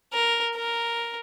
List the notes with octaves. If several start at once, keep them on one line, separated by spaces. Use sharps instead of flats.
A#4
A#4